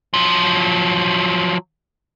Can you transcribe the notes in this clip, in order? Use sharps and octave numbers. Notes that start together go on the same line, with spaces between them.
F3 F#3